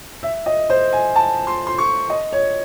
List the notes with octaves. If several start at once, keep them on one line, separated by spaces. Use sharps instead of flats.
E5
D#5
C5
G#5
A5
C6
C6
C#6
D#5
C#5